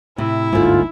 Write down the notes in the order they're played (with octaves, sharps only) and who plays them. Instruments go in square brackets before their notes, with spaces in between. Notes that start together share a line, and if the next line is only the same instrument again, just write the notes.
[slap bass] A2 [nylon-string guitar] C3 [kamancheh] E4
[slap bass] G1 D2 A#3 [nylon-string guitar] G#2 D3 [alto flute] F4